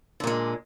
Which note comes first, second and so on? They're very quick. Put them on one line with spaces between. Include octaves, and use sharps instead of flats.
D3 A#2 G#3